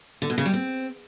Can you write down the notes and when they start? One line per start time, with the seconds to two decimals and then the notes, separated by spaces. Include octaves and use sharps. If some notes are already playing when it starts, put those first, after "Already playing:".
0.22 D3
0.30 B2
0.38 C#3
0.46 G3
0.53 C4